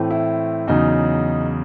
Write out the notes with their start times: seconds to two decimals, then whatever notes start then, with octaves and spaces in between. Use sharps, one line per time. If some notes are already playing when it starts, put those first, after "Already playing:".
Already playing: A2 E3 A3 C4
0.11 E4
0.67 E2 C#3 F#3 D#4